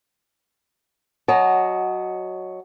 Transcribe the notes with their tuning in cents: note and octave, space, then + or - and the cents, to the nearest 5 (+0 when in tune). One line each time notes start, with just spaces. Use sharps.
F#3 +0 D#5 +0 A5 -45